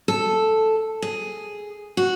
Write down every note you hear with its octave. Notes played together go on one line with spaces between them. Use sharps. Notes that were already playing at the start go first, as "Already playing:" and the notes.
A4
G#4
F#4